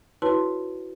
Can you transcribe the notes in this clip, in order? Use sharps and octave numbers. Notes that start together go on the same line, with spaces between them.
E4 F#4 B4 C#5 A5 C6